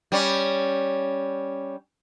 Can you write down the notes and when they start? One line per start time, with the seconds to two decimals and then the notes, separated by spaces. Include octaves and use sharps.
0.12 G3 C#4